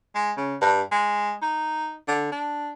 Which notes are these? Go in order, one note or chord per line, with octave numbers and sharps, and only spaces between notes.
G#3
C#3
G2
G#3
D#4
D3
D4